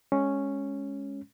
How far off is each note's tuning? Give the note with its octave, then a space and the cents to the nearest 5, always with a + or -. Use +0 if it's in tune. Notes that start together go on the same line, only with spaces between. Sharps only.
G#3 +0 C#4 +0